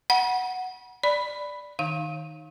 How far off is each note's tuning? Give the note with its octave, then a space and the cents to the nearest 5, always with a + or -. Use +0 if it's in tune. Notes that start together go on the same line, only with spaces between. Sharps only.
F#5 +0 B5 -40
D5 +0 B5 +0
D#3 +0 D#4 +0 F5 +0